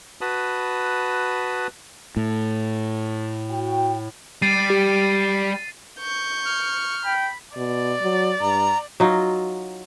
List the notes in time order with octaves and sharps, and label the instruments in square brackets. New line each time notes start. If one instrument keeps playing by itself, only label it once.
[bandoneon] F#4 B4 A5 B5 D#6
[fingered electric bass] A2
[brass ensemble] F#4 G5
[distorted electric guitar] G3 [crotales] A6 C7 D#7
[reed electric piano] G4
[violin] C#6 G6
[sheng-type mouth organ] F6
[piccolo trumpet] G5 [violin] B5
[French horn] B2 [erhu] D5
[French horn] F#3
[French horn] G2 [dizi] A#5
[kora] F#3 D#4 F4